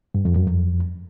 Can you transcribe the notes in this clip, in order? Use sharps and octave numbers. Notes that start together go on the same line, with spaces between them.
G2
F2
F#2
F2